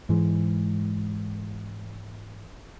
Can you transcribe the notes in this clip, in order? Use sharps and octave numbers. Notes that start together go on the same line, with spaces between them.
G#2 E3 G#3